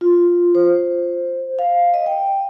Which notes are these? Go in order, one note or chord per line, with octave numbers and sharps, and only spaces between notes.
F4
C5
F5
D#5
G5